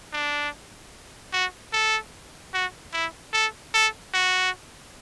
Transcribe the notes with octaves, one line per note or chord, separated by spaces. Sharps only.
D4
F#4
A4
F#4
E4
A4
A4
F#4